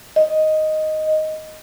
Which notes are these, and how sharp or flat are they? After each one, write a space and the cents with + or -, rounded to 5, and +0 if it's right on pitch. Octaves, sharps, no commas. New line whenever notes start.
D#5 +0